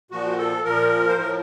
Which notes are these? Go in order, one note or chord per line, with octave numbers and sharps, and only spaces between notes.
A#2 F3 F#4
A4
A#2 F3 A#4
C5
A2 F3 A#4